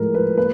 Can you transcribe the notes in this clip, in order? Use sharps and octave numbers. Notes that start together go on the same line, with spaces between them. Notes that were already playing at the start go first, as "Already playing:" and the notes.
Already playing: A2 F3 G#3 A#4
B4
A#3 B4